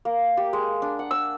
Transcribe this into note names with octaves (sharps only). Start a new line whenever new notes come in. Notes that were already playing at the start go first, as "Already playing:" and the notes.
A#3
G4
G#3
D4
F#5
E6